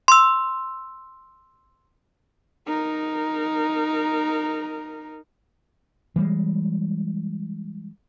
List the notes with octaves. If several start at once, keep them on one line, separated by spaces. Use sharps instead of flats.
C6 E6
D#4 A#4
E3 G3 G#3